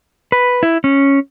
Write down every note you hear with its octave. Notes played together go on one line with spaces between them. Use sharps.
B4
E4
C#4